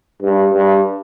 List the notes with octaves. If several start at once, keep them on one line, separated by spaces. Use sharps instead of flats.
G2
G2